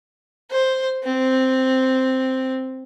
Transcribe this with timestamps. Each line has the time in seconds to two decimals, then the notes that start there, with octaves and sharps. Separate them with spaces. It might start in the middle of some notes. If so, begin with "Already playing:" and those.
0.51 C5
1.04 C4